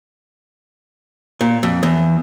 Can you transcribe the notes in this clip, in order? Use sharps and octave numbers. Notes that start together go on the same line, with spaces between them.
A#2
F2
E2